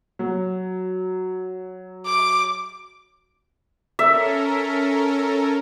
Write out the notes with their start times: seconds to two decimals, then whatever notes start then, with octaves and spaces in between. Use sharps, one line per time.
0.19 F#3
2.06 D6
3.99 C#4 A4 A#4 E5